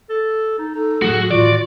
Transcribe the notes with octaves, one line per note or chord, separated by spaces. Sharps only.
A4
D#4
D#4 A4
A2 F#3 A3 F#4 G#4
A2 D#3 E3 F4 F#4 D5